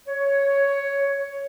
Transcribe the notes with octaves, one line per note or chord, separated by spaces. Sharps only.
C#5